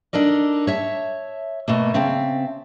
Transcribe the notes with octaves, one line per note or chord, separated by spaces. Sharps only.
D4 D#4 A4 A#4 D5
C#5 E5 A5
B2 A3 A#3
C#3 C4 E5 A5